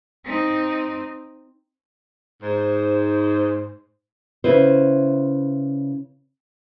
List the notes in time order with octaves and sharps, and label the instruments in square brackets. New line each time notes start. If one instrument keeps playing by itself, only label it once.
[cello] C4 D#4
[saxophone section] G#2 C5
[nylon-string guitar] C#3 E4 B4 C5